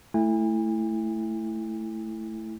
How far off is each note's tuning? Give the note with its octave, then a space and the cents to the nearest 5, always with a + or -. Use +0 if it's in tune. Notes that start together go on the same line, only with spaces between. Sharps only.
A3 +0 E4 +0 G#5 -40